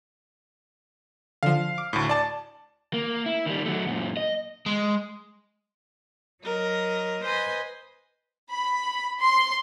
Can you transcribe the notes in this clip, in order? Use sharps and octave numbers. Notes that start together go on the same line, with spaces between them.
D3 F3 F5
D6
D2 A2
D5 A5
A#3
E4
D#3 G3
F#3 A3
F#2 A#2
D#5
G#3
F#3 A#4 D#5
B4 C5 D#5 G#5
B5
C6